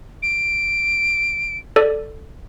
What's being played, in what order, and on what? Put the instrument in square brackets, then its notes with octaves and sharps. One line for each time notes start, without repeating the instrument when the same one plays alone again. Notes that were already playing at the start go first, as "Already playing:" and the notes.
[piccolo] D7
[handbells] A4 D5